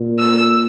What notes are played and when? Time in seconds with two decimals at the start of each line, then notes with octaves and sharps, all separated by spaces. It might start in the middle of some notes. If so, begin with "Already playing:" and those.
Already playing: A#2
0.19 E6